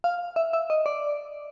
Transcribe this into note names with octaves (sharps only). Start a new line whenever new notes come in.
F5
E5
E5
D#5
D5